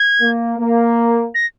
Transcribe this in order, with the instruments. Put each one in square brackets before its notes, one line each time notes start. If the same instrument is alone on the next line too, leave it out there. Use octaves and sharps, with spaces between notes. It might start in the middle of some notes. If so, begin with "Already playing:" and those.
Already playing: [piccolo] G#6
[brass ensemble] A#3
A#3
[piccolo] A#6